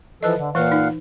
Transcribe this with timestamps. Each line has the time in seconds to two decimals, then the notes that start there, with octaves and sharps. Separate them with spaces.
0.23 E3 F3 A4 B4 D#5
0.37 D3
0.55 A#2 E3 B4 F5 F#5
0.72 D#4